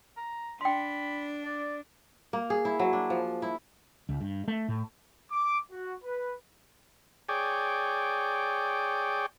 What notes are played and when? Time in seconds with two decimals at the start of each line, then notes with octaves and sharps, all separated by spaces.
0.17 A#5
0.61 D4 G5 B5 C6
1.45 D5
2.33 A#3
2.50 G#4
2.65 E4
2.79 F#3
2.93 D4
3.10 F3
3.42 E4
4.09 C#2
4.21 G2
4.48 A3
4.68 A2
5.31 D6
5.71 F#4
6.03 B4
7.29 G#4 C#5 D5 G5